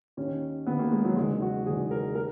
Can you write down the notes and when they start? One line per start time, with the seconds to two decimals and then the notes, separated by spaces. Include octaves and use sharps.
0.17 D#2 D#3 C#4
0.66 D#2 B3
0.71 D#3
0.79 A#3
0.92 G#3
1.04 F#3
1.16 F#1 E2 D#3 G#3
1.42 F#4
1.66 F#1 E2 D#3 G#4
1.91 A#4
2.15 A#4